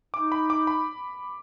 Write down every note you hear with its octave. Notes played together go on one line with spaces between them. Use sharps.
D#4 D6
B5
D6
B5